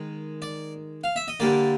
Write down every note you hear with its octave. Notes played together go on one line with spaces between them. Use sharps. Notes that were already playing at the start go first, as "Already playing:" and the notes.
Already playing: D#3 G#3
D5
F5
E5
D#5
D3 G3 A#3 D5